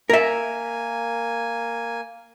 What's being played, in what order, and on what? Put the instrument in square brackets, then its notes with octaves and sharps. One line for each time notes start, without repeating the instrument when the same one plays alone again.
[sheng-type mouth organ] A#3 G#5 [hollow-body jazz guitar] A#4 E5